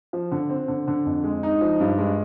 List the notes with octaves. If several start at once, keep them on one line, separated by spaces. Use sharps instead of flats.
F3
D3
C4
D3
D3
F2
G#3
D#4
F3
G2
G#3